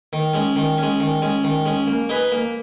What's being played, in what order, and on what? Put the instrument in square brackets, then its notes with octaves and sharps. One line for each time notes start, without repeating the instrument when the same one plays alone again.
[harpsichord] D#3
G#3 C#4
D#3
C#4
G#3
D#3
G#3 C#4
D#3
G#3 C#4
A#3
D#4 G#4 B4
A#3